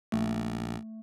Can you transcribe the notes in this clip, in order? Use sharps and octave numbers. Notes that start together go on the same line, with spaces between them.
A#1 A3